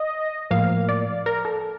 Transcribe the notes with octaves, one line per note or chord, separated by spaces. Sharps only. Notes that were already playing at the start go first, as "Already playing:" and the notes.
Already playing: D#5
A2 F3 A#3 F5
D5
A#4
A4